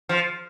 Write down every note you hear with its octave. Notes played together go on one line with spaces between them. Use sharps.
F3